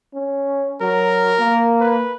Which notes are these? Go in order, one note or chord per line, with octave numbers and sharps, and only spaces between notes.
C#4
F#3 A#4
A#3
B4